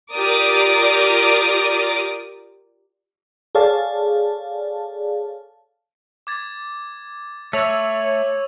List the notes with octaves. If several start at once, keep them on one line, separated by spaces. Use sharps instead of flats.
F4 G4 A#4 D5 D6 D#6
G#4 A4 C#5 D5 F5 A5
D6 G#6 A6
A3 C#5 C#6 E6 F7